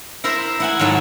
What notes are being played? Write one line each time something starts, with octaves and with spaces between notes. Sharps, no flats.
E4 A#4 C5 E5 A#5
E4 F#5 G#5
G#2 D#3 F#3 A4 G#5